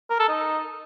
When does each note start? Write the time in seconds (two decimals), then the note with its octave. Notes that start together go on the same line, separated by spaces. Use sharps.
0.10 A#4
0.19 A4
0.29 D#4